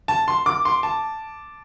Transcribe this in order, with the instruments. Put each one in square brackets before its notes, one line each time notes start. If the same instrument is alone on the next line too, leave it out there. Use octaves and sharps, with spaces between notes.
[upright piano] A5
C6
D6
C6
A5